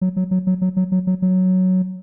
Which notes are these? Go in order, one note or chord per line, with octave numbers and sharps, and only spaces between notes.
F#3
F#3
F#3
F#3
F#3
F#3
F#3
F#3
F#3